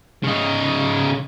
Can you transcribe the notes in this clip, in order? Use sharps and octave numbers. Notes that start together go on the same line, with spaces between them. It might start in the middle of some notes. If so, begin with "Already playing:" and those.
C#3 D#4